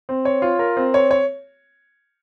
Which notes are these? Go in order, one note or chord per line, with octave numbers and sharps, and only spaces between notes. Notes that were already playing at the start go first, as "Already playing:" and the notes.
C4
C#5
F4
A#4
C4
C#5
C#5